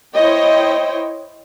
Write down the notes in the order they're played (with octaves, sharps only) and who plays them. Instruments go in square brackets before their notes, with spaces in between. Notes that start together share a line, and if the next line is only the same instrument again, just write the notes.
[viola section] E4 C5 C#5 D#5 G5